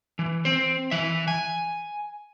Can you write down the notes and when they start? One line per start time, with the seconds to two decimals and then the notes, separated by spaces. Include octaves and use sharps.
0.19 E3
0.45 C4 C5
0.91 E3 E5
1.28 G#5